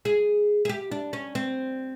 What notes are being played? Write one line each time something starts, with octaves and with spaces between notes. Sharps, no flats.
G#4
G#4
G4
D4
C#4
C4